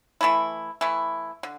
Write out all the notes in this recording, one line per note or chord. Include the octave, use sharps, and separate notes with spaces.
E3 A3 E4
E3 A3 E4
D3